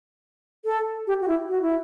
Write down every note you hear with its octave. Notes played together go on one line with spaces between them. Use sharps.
A4
G4
F#4
E4
F#4
E4